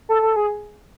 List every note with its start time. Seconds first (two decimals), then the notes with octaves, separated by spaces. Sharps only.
0.09 A4
0.22 A4
0.36 G#4